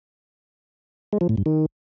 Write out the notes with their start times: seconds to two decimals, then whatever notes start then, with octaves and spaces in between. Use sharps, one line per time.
1.13 G#3
1.21 F3
1.29 A2
1.37 G2
1.46 D#3